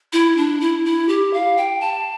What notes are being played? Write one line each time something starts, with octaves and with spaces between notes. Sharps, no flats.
E4
D4
E4
E4
G4
F5
G5
A5